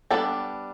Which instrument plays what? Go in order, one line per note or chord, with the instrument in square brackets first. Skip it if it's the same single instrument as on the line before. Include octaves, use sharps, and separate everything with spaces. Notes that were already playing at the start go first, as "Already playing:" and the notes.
[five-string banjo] G3 B3 D4 A4